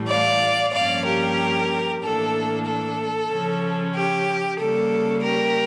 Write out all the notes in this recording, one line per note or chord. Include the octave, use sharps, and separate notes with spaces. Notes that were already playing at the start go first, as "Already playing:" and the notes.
Already playing: A2 E3 G3
D5 F5
G2 F3 A#3 C#4 D5 F5
G4 A#4
A2 E3 A#3 D4 A4
A4
C#3 F3 C#4
G4
C#3 G3 A#3 A4
G4 A#4